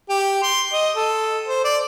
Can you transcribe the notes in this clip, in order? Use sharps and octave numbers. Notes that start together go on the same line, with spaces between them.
G4
C6
D#5
A4
C5
D5